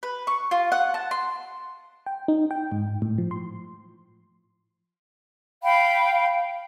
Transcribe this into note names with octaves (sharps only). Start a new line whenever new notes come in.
B4
C#6
F4
F#5
A5
C6
G5
D#4
G5
G#2
A2
F3
C6
F5 G5 B5